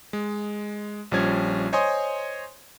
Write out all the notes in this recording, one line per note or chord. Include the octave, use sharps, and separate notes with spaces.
G#3
A#1 F3 G3 C#4 G#6
C5 C#5 D#5 G#5 C6 D#6